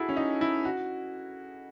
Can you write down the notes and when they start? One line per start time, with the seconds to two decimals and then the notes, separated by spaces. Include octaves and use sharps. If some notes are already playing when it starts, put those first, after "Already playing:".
Already playing: E4 F#4 G#4 A4 B4
0.09 C#4
0.17 D#4
0.41 E4
0.65 F#4